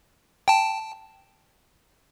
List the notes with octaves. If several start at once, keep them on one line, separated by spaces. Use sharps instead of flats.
G5 A5